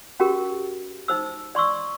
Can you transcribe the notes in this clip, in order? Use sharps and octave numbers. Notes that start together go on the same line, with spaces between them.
C#4 F#4 G4 A#4
D#4 C5 E6
D5 C6 C#6 E6